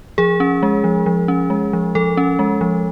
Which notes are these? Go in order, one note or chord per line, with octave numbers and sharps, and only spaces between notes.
F3 G#4
C#4
G#3
F3
F3
C#4
G#3
F3
F3 A4
C#4
G#3
F3